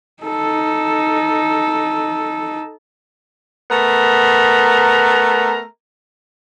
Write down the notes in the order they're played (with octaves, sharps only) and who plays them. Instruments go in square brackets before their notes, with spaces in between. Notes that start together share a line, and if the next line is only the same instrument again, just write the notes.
[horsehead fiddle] D#4 A4
[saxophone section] A3 B3 A#4